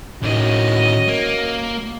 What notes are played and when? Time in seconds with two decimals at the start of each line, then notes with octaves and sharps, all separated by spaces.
0.23 A2 D#3 C#4 F#4 D#5
1.08 A#3